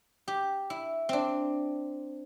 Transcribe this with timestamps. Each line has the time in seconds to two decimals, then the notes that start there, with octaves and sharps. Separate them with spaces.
0.28 G4
0.70 E4
1.09 C4 D4